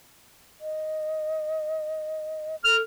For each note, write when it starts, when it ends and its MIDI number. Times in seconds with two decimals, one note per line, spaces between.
0.61 2.56 75
2.64 2.82 69
2.64 2.77 89